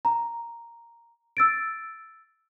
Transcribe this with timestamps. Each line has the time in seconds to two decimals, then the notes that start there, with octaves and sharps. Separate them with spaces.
0.05 A#5
1.37 E6 A6 D7